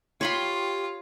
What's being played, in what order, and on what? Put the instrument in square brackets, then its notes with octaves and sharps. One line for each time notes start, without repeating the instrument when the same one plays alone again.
[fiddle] F4 [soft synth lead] G4 [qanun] C#5 B5 C6